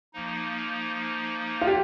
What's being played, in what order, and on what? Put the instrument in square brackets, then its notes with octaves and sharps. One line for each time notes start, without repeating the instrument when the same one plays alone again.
[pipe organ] F3 A#3 D#4
[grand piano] F4
G4